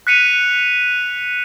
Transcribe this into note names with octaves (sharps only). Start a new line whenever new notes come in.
F#6 B6 C#7 D#7 F7